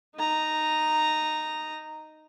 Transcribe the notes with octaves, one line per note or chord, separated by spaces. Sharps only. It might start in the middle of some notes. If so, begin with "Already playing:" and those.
D#4 A#5